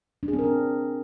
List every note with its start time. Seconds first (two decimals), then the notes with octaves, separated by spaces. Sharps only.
0.23 D4
0.28 G#4
0.33 C4
0.39 A#4
0.44 D4